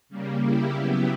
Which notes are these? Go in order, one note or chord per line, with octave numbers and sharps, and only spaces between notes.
C#3 G3 A#3
E4 G4
C#3 F#3 B3